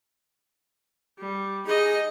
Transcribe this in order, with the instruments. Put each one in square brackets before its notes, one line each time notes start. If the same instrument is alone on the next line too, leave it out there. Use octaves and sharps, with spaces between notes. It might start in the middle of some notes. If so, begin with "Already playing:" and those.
[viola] G3
[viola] D#4 D#5 [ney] G#4